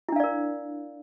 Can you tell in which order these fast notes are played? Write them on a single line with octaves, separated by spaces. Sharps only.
E4 D4 F5 D5 A#4